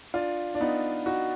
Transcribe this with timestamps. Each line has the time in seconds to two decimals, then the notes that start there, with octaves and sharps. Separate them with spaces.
0.14 D4 F4
0.55 D4
0.60 B3 D#4
1.06 D#4 F#4